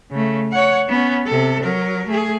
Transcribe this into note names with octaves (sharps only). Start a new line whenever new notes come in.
C#3 A3
C#5 F#5
B3 C#4
C3 A4
F#3 A#4
A3 G#4